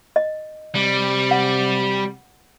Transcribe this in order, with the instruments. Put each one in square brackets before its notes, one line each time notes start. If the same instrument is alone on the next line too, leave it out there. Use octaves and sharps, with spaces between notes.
[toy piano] D#5
[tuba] C3 [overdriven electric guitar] G3
[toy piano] F#5